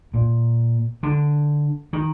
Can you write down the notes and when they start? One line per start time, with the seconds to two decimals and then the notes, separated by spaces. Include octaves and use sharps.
0.14 A#2
1.03 D3
1.93 D#3